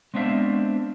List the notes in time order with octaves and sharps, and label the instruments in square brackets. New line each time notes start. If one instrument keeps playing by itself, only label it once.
[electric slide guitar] G#3 B3 C4 D4 E5 F5